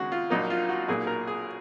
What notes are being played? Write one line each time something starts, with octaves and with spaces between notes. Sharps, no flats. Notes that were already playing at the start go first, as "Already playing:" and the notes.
Already playing: D#2 C#3 G#3 F#4
F4
A#1 A#2 F#3 A#3 D#4
F4
F#4
B1 A#2 F#3 A#3 G#4
A#4
G#4